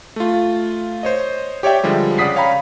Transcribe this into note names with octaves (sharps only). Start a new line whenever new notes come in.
A3 F4
C5 C#5 D#5
G4 C#5 D5 E5 G5
D3 F3 G3 G#3
C#3 D5 F#5 D#6 B6 C7
C#5 F5 G5 A#5 B5